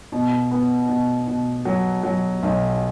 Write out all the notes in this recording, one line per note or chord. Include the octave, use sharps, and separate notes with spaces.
B2
B3
B2
B2
F#3
F#3
B1